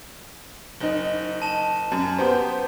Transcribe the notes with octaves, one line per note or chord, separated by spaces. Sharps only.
F#1 D#4 G7
A5 E7
F#2
B3 G4 C5